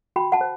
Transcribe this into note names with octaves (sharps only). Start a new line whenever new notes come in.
F#4 G5 B5
F#5 A5
C5